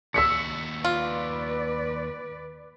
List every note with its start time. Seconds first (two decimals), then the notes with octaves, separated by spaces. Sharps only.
0.14 D#2 F#4 E6 B6 C#7
0.85 F4 B4 D5